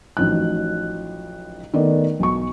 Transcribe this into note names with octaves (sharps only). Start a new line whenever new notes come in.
A1 F3 F#3 D#4 F#6
D#3 A3 B3 D5
B1 C#6